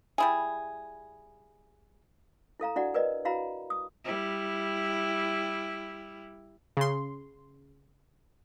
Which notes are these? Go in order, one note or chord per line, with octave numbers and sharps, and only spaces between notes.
G3 E4 G#4
E4 A4 F5 A#5
D4 E4 F#4 D5 F#5
A#4 B4 D5 D#5
E4 F#4 F5 A#5 B5
D#6
G3 E4
C#3 C6